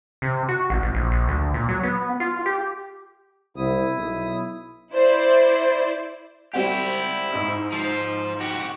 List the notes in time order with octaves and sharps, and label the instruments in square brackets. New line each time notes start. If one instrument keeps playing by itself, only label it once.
[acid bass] C3
F#4
A1
A1
A#1
A#1
D2
A#2
F#3
B3
F4
G4
[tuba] C2 [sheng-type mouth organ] E4 D#6
[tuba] B1
[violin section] E4 C5 D5
[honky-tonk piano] G3 C4 F#4 [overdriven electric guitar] E4 G4
[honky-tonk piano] G#2 D#4 E6
[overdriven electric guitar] F3 C5
F#4 G4